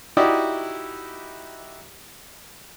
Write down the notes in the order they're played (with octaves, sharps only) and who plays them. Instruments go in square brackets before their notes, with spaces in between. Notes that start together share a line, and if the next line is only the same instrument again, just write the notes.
[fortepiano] D#4 E4 F#4 G4 D5 D#5